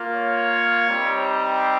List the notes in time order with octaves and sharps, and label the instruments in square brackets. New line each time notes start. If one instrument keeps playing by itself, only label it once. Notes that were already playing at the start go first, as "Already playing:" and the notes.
Already playing: [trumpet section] A#3 F4
C#5
G3 C4 D#4 G4